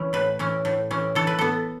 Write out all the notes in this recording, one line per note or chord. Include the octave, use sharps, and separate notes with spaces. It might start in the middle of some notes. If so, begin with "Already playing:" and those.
Already playing: E3 C#4
A2 B4
E3 C#4
A2
E3 C#4
E3 A4
B4
B3 A4